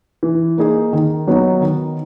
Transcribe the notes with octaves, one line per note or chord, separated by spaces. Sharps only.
E3
A#3 D#4 G#4
D#3
F#3 B3 D#4 F#4
D#3